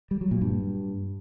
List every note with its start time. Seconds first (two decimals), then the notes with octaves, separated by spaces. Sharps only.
0.11 G3
0.21 F#3
0.31 A#2
0.41 G2